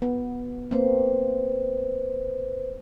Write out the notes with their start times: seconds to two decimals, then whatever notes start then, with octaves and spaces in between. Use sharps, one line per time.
0.02 B3
0.71 A#3 C4 B4 C5